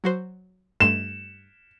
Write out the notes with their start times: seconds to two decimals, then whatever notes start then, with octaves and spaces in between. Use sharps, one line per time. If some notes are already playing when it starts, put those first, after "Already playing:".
0.04 F#3 F#4 C5
0.80 G2 A3 C6 E7